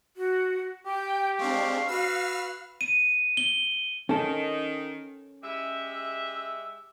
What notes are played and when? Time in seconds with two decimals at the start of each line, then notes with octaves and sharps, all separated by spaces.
0.17 F#4
0.86 G4 G5
1.39 G#3 C4 D4 F5 C#6
1.88 F#4 B4 E6 F6
2.81 D#7
3.37 G7
4.09 D#3 C#4 A4 A5
5.43 G#3 G4 E5